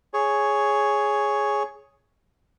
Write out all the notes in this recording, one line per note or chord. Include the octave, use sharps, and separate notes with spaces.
G#4 C#5